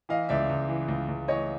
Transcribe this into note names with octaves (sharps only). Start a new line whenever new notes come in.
E3 D#5 F5
C#2 D5 E5
C#2
E3
C#2
C#2
E3 C#5 D#5